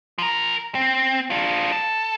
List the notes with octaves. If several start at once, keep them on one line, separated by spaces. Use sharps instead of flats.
F3 A#4
C4
D4 F4
A4